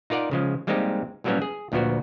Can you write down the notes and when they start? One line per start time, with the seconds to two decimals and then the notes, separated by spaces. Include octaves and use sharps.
0.10 D#4 F4 A#4 D5 F#5
0.31 C#3 F3 G#3
0.67 G3 G#3 A#3 C4 D#4 G4
1.24 A2 F#3 G3 A#3 B3 C#4
1.42 G#4
1.72 D2 A#2 F3 B3 F#4